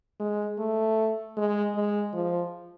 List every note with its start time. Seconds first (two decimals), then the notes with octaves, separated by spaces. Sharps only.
0.20 G#3
0.59 A3
1.37 G#3
1.76 G#3
2.14 F3